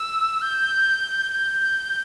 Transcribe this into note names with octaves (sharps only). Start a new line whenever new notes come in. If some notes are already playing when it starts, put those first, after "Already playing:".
Already playing: E6
G6
G6